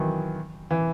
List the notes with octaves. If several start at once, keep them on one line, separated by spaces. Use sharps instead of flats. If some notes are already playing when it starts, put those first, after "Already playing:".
Already playing: D#3 E3 F#3
E3